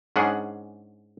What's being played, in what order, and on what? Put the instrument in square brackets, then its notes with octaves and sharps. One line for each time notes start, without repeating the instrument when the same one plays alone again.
[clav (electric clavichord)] G#2 C#4 D4 G#4 F#5